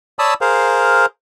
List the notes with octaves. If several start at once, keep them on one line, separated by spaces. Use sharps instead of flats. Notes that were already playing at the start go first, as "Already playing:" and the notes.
C#5 D5 A5 B5 D#6 E6
G#4 A#4 C5 F5